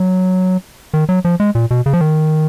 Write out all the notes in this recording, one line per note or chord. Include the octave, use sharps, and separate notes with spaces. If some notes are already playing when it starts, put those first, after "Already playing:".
Already playing: F#3
D#3
F#3
F3
G#3
A#2
B2
C#3
F3
D#3